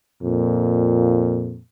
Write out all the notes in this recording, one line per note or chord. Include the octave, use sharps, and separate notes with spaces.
F2 A#2